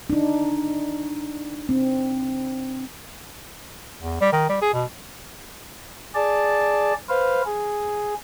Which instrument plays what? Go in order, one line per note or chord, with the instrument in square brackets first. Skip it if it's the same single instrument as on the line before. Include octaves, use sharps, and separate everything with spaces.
[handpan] D4 D#4
C4
[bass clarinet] E2
G3
D#3
G3
G#4
B2
[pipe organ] G#4 D5 A5
B4 C5 F5
G#4